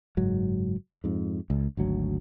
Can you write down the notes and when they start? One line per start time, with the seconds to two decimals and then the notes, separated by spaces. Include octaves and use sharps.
0.17 F#1 G#2 F#3
1.04 F2 G#2
1.50 C#2
1.77 G#1 D2 F#3